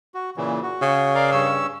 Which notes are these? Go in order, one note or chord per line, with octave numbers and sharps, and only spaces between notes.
F#4
A#2 C#3 E3
F#4
C#3
A#4 D5 F5
G2 C#4 E6